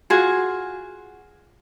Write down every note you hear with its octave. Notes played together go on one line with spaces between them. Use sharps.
F4 F#4 G#4